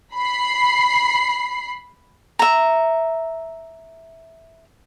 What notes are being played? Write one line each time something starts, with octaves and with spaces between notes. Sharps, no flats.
B5 C7
E5 A#5